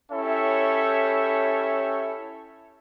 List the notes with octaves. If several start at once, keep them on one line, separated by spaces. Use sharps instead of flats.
C#4 E4 G4 A4 C#5 E5